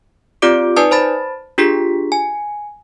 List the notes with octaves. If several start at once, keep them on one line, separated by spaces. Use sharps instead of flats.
C4 F4 G4 D5 D6 D7
D#4 B4 D5 G#5 A5 D#6
C5 A5 B5 A6
D4 F4 G4 G#4 B6
G#5